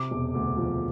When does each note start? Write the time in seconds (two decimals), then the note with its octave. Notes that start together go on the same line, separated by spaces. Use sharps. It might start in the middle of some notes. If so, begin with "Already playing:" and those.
Already playing: C3 D6
0.11 E1
0.34 D2
0.57 F3